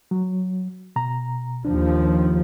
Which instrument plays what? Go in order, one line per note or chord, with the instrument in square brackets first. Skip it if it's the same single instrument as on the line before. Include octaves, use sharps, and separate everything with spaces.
[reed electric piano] F#3
B2 A#5
[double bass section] D#2 F3 [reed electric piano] D4